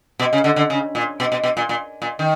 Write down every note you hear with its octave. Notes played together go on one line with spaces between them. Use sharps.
B2
C#3
D3
D3
C#3
A#2
B2
B2
B2
A#2
A#2
A#2
D#3